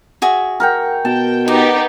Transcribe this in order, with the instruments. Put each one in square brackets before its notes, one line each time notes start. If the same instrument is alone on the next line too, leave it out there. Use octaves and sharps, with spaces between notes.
[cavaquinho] F#4 G#4 E5
[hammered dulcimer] A#4 F#5 G5
[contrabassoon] B2 [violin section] G5 [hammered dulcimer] A5
[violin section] B3 D#4 G4 [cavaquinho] D5